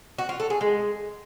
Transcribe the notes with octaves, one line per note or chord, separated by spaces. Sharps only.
F#4
F4
A4
G#4
G#3